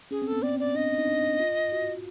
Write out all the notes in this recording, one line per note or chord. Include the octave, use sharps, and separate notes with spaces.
C#4 G#4
C4
B3 A4
C4 D5
D5
D4 D#5
D#4
D4
F4
F#4